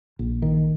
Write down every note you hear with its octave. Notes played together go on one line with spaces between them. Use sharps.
A#1
D#3